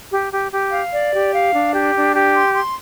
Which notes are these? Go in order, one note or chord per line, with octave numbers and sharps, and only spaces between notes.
G4
G4
G4
F5
D5
G4
F5
D4
G4
D4
G4
C6
C6